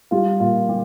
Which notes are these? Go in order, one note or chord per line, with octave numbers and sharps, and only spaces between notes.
G3 F4
A#2 F4
G3 G4